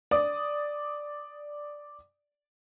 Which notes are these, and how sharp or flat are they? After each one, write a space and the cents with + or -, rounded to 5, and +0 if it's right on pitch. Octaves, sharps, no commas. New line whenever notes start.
D5 +0 D#6 +0